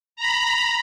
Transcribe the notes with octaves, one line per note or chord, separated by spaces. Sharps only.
A#5 B5